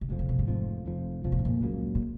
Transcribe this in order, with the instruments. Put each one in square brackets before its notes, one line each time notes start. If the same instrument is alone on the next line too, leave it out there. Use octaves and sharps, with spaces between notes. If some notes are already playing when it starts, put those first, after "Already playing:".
[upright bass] C#3
[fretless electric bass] F1 F2 F3 [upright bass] B2
[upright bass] C#3
B2
G#2
[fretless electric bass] F1 F2 F3
F1 F2 F3
[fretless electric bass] F1 F2 F3 [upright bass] B2
[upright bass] A#2
G#2
A#2
[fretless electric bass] C#2 C#3 F#3 A#3
[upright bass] A#2